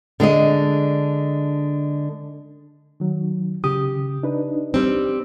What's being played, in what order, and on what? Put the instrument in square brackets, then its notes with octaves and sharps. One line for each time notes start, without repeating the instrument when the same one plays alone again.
[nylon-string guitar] D3 G#3 D4 D#5
[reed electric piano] D#3 F#3
[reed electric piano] C#3 D#6 [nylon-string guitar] G4
[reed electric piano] D4 D#4 B4
[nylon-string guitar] G3 C4